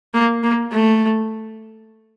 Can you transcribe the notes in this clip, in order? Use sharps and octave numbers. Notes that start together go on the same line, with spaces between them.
A#3
A#3
A3